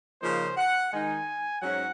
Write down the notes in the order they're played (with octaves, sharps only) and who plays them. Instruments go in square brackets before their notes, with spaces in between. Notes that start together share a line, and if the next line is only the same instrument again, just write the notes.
[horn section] C#3 F3 A#3 D#4 C5
F#5
D#3 G#3 D#4 G#5
G#2 F#3 C#4 F#5